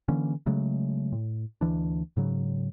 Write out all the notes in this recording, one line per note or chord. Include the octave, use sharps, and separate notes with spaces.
D3 E3 A#3 C#4
C#3 F#3 G#3 A3
A2
D2 E3 D4
G#2 C#3 F#3